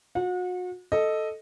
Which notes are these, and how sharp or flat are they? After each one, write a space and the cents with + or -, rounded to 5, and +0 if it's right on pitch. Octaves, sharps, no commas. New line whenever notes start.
F#4 -35 F#5 -40
A4 +0 D#5 +0